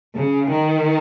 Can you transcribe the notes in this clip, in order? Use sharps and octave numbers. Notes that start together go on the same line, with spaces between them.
C#3
D#3